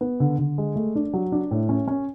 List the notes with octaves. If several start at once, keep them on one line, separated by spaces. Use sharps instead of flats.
B3
D3
D3
G#3
A3
D4
F#3
D4
A2
C#4
C#4